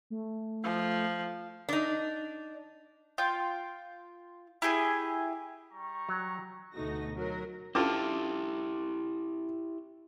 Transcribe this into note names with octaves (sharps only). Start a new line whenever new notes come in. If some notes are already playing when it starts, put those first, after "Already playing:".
A3
F3
D4 D#4
F4 G5
E4 G4 G#4 G#5
G3 A#5 C#6
F#3
D2 B2 A3 D#4 F#4 A#6
F#3 A#4
C#4 D4 E4 F4 G4 A4 D6